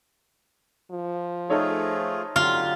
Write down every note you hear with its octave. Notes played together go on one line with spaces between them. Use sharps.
F3
A3 D#4 F4 G#4 A4 C#5
D3 F#3 F4 G4